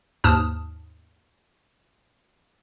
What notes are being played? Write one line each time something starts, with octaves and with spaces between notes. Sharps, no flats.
D#2 G#2 A5 D#6 F6